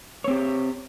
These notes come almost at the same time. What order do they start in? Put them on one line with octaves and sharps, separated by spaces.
C#5 C4 G4